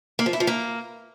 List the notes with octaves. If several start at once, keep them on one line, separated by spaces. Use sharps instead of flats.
A#3
F3
E4
F3
A#3